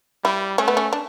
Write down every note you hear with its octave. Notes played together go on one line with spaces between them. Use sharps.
G3 E4
A3 C#4
B3
C#4
D4